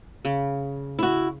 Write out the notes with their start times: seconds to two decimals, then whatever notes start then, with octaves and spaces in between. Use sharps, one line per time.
0.25 C#3
0.99 E4 F#4